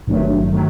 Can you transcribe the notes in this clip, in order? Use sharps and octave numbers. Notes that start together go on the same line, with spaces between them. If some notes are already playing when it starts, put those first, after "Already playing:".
G#1 G2 D#3 F#3 A3
D#3 F#3 A3